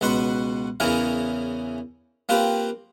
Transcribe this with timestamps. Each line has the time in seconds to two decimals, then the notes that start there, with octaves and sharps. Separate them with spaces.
0.01 C#2 B2 F#4 B4 C6 C#6
0.80 E2 C#3 E3 C#4 E4 A#4
2.29 A#3 C4 F4 G4 B4